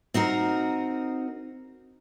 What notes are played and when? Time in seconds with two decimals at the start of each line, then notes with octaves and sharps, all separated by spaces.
0.14 C4 D#4 F#4 A#4